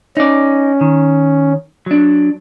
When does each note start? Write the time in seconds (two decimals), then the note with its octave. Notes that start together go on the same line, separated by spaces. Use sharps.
0.17 C#4 D#4 D5
0.81 D#3
1.86 F#3 D4